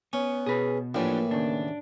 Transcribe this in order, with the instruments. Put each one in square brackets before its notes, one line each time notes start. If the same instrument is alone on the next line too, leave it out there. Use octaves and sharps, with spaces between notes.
[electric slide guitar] B3 [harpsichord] C#4
[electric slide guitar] B2 [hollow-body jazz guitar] G#4 B4
[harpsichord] A2 E3 [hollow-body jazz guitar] F3 [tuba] A#3 [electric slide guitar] D4 G4
[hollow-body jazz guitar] D#2 C#3 [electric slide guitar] D4